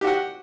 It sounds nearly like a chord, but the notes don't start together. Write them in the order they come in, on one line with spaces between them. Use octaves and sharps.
G4 F#4 F#5